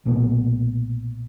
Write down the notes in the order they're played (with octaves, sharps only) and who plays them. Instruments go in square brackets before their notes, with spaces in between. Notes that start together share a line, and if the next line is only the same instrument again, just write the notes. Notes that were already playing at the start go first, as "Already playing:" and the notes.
[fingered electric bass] B1 A#2 A3 B3